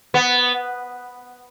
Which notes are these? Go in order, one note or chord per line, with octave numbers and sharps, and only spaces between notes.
B3